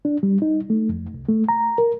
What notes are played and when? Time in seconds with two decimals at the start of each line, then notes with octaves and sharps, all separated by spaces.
0.05 D4
0.23 G3
0.42 D#4
0.70 A3
0.89 F2
1.14 C2
1.29 A3
1.49 A#5
1.78 A#4